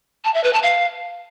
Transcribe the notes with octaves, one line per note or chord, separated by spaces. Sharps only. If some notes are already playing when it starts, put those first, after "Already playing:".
A5
E5
B4
A5
F5